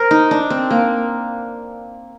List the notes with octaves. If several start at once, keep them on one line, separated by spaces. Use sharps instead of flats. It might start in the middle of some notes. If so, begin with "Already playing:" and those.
Already playing: A#4 C5
D#4
D4
C4
A#3